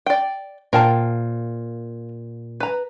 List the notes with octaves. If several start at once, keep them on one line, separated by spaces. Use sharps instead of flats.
D5 G5
A#2 A#4 C5 F5 G5 A5
B4 A#5